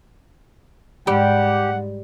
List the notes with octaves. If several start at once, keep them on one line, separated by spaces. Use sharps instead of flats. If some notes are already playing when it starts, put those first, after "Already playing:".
G#2 G3 G4 F#5